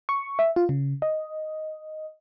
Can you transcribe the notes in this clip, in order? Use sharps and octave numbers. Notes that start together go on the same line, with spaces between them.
C#6
E5
F4
C#3
D#5